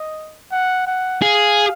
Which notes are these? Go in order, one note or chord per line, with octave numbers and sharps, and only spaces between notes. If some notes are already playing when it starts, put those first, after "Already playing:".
Already playing: D#5
F#5
F#5
G#4 F5